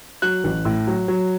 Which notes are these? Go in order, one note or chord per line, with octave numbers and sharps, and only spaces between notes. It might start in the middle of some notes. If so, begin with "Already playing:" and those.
F#3 F#6
A1
A2
F#3
F#3